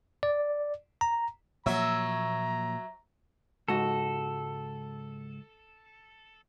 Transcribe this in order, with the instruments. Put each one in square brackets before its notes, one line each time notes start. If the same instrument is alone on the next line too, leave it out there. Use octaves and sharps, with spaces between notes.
[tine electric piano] D5
A#5
[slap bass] A#2 F3 A#3 [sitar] F#3 E5 [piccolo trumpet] A#5
[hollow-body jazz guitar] C#2 G#2 F#4 [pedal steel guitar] A4